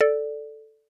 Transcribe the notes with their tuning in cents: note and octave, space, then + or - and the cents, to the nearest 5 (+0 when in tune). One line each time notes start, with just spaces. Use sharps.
A4 +0 D5 +0